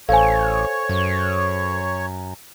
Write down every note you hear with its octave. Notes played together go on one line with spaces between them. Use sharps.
A1 A4 C5 C#5 F5 G#5
F#2